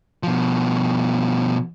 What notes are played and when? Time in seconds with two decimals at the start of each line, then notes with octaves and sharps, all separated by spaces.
0.23 B2 F3